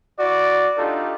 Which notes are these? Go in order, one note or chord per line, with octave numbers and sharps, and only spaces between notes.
E4 F#4 D5
D4 D#4 F4 G4 A4